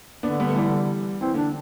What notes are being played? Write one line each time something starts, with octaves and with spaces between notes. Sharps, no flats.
D3 B3 D4
G3 B3
A3
E3 G3
E3 C4
D3 D4